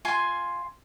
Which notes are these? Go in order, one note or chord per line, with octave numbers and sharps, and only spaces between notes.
F4 G#5 C6